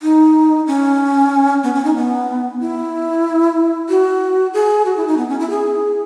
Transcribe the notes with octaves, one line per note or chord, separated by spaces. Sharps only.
D#4
C#4
B3
C#4
D#4
B3
E4
F#4
G#4
F#4
E4
D#4
B3
C#4
E4
G#4